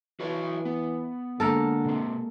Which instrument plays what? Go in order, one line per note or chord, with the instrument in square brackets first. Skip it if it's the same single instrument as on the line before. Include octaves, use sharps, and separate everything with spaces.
[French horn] E3 [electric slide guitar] F#4 B4 C#5
[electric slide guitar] B3
[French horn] D3 [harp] G#3 A#3 A5 [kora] A4 A#4
[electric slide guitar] B2 C4